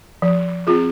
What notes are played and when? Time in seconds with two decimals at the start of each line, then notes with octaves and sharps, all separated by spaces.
0.22 F3
0.67 C4 F4 G#4